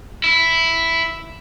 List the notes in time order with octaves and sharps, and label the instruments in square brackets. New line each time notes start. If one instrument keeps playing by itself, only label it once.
[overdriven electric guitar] E4